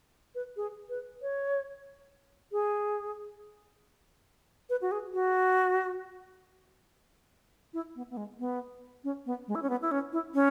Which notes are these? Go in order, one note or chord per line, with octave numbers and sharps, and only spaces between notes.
B4
G#4
B4
C#5
G#4
B4
F#4
G#4
F#4
E4
B3
B3
G#3
B3
C#4
B3
G#3
E4
C#4
B3
E4
C#4
E4
C#4